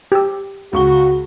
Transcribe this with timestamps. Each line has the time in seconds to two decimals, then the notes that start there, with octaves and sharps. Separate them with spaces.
0.12 G4 E6
0.73 C#2 F#4 C#6 G7